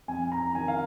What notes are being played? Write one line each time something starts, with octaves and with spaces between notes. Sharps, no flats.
F2 G#5
A#5
D#3 G#5
F5